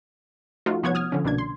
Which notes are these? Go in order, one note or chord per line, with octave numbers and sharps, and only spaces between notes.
F3 A3 D#4 F4 F#4
C2 F3 B3 C#5 F#5 G#6
D#6 F6 G#6
D3 F3 C#4
C2 B2 A#3 D4 G#6
C6